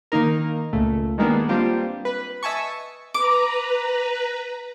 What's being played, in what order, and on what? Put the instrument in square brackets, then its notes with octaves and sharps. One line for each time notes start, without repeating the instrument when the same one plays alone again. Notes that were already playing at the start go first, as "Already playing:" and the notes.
[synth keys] D#3 A#3 D#4 A#4
C#2 A#2 A3
D#3 G3 G#3 A#3 B3 D4
G3 A#3 C4 D4 F4 G4
B4
D#5 E5 G#5 A5 C#6
[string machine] B4 A#5 [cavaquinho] D6